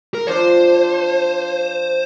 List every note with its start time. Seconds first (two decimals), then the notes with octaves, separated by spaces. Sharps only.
0.14 A#4
0.27 F3 D4 F4 C5